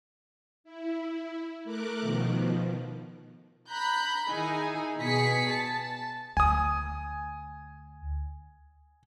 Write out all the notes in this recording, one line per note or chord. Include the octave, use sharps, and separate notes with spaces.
E4
A3 A#4 D6 F#6
B2 D#3 F3
A#5 B5 F#6 G6
D#3 D#4 E4 G#4 G#5
B2 G#4 B6 C#7
A5
D2 G#5 D#6